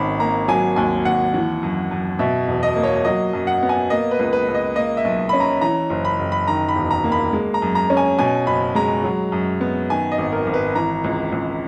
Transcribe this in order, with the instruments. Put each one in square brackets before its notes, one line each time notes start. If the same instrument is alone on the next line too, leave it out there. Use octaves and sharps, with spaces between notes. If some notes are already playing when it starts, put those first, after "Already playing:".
Already playing: [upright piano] G#1 D#3 C#4 B5
A#3 A#5
F#3 G#5
D#2 G#5
D#2 F#5
E3
F#2
F#2
B2 E5
E1
D#5
A#3
C#5
F#3 D#5
F#2
F#5
B3
G#5
A#3 D#5
B4
C#2
B4
C#2
D#5
A#3 D#5
E5
B1
C#4 B5
A#5
E3 A#5
F#1
B5
F#1
B5
D#3 A#5
B5
E1
A#5
A#3
B5
G#3
A#5
F#2
A#5
C#4
G#5
B2 G#5
F#1 B5
G#3 A#5
F#3
F#2
B3
D#3 G#5
D#5
G#1
A#4
G#1
B4
E3 A#5
C#2
C#2